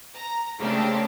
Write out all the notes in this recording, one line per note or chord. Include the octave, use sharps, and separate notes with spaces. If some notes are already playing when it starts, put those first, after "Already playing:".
A#5
C#3 A3 A#3 C4 D4 G4